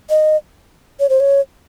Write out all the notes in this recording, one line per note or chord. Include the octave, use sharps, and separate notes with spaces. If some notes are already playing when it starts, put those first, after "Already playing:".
D#5
C#5
C5
C#5